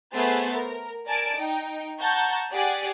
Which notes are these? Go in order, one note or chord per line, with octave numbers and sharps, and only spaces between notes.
A3 B3 G#4 C5 A6
A#4
A#4 D5 G#5 A5 A6 D7
D#4 G5
F#5 A5 A#5 C#6 G6
G4 G#4 D5 F#5 G#5